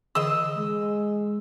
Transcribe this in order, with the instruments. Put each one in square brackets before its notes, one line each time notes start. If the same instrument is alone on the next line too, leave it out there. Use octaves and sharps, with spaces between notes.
[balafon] D3 E3 G#4 [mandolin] D#5 E6
[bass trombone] G#3